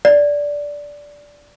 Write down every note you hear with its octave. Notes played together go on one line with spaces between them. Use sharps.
D5